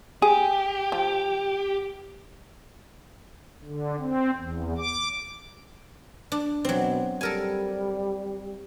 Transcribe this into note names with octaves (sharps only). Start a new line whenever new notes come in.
G4 G#4
F3
D3
C4
E2
D6
D4
B2 F#3 C4
G3 A4 A#4 G#5